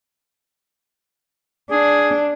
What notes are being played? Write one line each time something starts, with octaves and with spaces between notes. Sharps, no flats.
D4 G#4